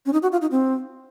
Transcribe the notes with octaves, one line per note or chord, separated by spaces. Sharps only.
C#4
D#4
F#4
F4
D#4
C4